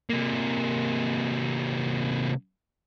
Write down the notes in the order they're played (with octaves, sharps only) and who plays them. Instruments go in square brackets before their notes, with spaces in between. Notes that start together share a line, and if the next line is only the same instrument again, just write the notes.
[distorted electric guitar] C3 A#3